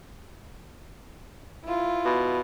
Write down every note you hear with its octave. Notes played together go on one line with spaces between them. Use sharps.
E4 F4
B2